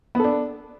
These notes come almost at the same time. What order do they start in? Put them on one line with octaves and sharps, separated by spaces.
B3 A4 D4